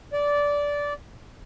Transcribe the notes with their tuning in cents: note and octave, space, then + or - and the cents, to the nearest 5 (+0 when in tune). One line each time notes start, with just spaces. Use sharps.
D5 -15